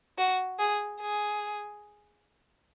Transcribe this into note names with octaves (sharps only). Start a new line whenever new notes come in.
F#4
G#4
G#4